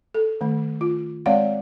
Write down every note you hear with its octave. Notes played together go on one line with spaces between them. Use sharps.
A4
D#3 A3
F4
G#3 C4 C#5 D5 F5 F#5